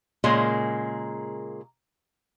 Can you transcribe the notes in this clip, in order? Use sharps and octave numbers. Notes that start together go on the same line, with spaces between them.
A#2 C#3 G#3 A#3